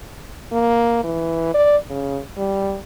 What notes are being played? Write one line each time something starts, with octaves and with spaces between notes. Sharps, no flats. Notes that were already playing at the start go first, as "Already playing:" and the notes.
A#3
E3
D5
C#3
G3